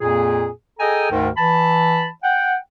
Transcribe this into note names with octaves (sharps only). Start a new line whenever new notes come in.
F2 A#2 A#3 G#4
G#4 A4 D#5 G5 G#5 A#5
D2 G#2 D#3
E3 A5 B5
F#5 G5